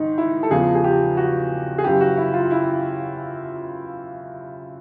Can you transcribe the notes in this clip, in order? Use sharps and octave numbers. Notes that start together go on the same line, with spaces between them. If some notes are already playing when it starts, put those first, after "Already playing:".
Already playing: G#2 D#3 D#4
E4
A4
E2 C#3 F3 G#4
G#4
G4
F#4
G#4
F#2 C#3 E3 G4
F#4
E4
F4
E4